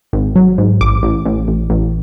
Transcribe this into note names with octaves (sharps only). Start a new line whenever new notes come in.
G#1
F#3
G#2
A1 D6
A1
A1
A1
A1